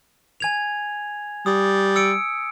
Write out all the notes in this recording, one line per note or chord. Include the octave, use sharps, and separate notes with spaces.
G#5 G#6 F7
G3 D#6
E6 C#7 D7